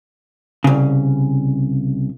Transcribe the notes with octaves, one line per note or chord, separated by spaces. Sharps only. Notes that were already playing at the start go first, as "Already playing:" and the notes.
C2 C#3